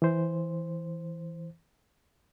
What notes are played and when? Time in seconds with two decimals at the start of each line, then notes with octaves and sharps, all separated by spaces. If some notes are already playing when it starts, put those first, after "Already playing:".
0.02 E3 C5